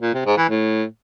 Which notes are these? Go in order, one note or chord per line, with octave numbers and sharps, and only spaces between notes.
A#2
C3
G#2
E3
A2